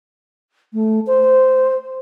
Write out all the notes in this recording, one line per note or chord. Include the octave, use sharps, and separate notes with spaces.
A3
C5